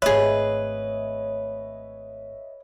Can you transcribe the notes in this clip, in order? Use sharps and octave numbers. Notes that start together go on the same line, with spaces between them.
G#1 A3 G#4 B4 C#5 D#5 E5